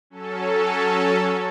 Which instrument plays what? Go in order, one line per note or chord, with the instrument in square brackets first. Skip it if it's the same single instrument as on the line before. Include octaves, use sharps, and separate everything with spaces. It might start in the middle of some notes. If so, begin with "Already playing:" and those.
[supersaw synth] F#3 C#4 A4